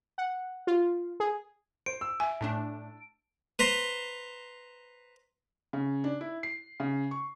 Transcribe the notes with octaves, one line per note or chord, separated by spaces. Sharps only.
F#5
F4
G#4
C5 D7
E6
E5 G#5
A2 A3 D4 A5
B4 C5 A#5 C6
C#3
D4
E4
C7
C#3
C#6